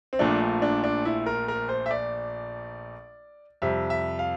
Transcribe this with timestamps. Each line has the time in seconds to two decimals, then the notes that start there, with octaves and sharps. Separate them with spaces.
0.13 C4
0.19 A#1 A#2 F3 A3 D4
0.62 D4
0.84 D4
1.05 E4
1.26 A#4
1.48 A#4
1.69 C5
1.86 E5
1.91 D5
3.62 F2 C3 G3 E5
3.90 E5
4.19 F5